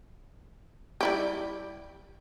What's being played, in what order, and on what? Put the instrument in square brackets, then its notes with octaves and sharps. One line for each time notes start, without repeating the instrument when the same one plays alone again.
[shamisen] G3 E4 G4